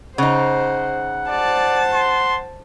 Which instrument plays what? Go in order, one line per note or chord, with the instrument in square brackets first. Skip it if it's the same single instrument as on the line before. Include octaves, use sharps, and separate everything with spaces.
[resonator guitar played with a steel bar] C#3 D#4 [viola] C5 [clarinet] F#5
[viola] C5 A5 [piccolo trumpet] D5
[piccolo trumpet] C6